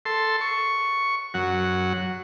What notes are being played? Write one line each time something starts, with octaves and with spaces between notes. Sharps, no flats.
A4 C6
C#6
F#2 F#5